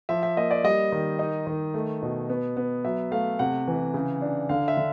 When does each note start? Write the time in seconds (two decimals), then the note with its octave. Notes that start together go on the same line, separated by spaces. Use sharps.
0.09 F3 E5
0.23 E5
0.37 A#3 D#5
0.51 D5
0.64 G3 D#5
0.92 D#3
1.19 D#4
1.47 D#3
1.74 A3
2.02 B2
2.29 B3
2.57 B3
2.85 F#3 E5
3.11 A3 F5
3.39 C3 F#5
3.68 E3
3.94 C#3
4.22 D4
4.49 D3 F5
4.68 E5
4.77 D3